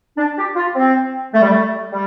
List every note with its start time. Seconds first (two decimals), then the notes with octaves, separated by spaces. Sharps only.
0.17 D4
0.37 G4
0.56 F4
0.75 C4
1.33 A3
1.41 G3
1.50 A3
1.92 G3